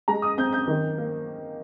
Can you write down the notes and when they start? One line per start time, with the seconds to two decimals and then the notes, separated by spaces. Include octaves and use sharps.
0.08 G#3 A#5
0.22 D#6
0.38 C4 G6
0.53 G6
0.67 D#3
0.98 A#3